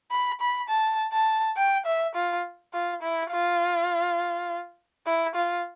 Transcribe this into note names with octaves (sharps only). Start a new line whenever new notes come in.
B5
B5
A5
A5
G5
E5
F4
F4
E4
F4
E4
F4